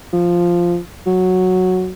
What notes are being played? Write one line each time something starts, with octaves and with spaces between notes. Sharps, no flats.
F3
F#3